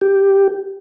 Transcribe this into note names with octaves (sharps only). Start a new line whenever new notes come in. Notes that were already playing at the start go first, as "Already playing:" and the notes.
G4